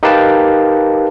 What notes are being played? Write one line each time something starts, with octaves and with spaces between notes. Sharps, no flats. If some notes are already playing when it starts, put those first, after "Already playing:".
D#4 G4 A#4 B4 F5 A5